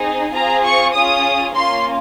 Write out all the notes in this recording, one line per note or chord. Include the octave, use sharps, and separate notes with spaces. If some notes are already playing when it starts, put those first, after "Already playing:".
Already playing: C4 D#4 G#4
C4 F4 G#4 A#5
C#6
C#4 F4 G#4 D#6
A#3 C#4 F4 C6